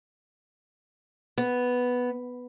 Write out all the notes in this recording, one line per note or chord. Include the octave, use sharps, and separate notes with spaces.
B3